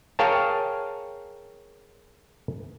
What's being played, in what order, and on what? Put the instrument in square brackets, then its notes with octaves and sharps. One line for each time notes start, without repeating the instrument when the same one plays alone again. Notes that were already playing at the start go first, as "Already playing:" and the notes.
[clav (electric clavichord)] G#4 A#4 C#5 F5 G5 A5